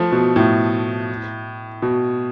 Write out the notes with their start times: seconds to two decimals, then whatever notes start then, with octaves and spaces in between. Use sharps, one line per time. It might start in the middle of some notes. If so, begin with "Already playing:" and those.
Already playing: F3 A3
0.12 B2
0.36 A2
1.82 B2